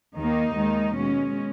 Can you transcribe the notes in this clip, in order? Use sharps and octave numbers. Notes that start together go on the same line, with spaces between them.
D#2 D#3 A#3 D#4
D#2 D#3 G#3
B2 G#3 C#4